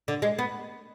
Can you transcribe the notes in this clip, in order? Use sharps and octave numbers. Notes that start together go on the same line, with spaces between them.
D3
G#3
B3